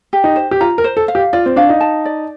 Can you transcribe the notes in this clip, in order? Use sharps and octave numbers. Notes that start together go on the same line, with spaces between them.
G4
D#4
C5
G4
F4 A#5
A#4
C5
A4
F5
G4
F4 D5
C4
D4 F5
D#4
A5
D5